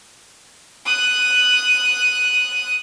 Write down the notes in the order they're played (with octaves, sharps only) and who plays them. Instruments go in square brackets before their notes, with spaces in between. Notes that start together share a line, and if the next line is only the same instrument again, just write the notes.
[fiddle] D#6 F#6